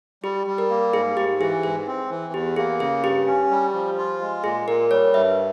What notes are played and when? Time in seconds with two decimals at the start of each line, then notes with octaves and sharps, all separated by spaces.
0.23 G3 G4
0.47 G3
0.58 A#4
0.70 A#3
0.93 G#2 G#4
1.16 G#2 G4
1.40 E3 G#4
1.63 G#2 G#4
1.87 C4
2.10 E3
2.33 E2 G4
2.56 A#3 G#4
2.80 C#3 G#4
3.04 G2 G4
3.27 C#4
3.51 G3
3.73 F3
3.98 F4
4.21 G#3
4.44 A#2 G#4
4.67 A#2 A#4
4.91 G3 C#5
5.14 G2 E5